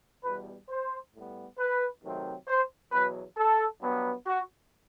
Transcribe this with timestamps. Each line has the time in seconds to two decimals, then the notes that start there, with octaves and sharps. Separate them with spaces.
0.23 E2 B2 G3 B4
0.69 C5
1.13 A2 G3 B3
1.59 B4
2.03 C3 D#3 F#3 A3 C4
2.48 C5
2.92 E2 B2 F#3 B4
3.37 A4
3.82 G2 F#3 B3
4.27 F#4